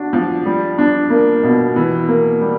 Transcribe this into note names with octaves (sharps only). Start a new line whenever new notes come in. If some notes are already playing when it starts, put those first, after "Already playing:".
Already playing: D4 F#4
F3
G3
D4
A#3
B2
E3
A#3
G3